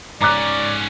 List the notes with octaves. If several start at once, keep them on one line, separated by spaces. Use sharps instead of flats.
G#2 C#4 D5 A#5 D6 F#6